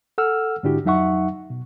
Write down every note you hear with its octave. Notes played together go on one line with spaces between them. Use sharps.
A4 F#5 E6 F6
G#2 D3 D4 E4 F#4 G4
F2 F#3 D#4 E5 F#5 C#6
B2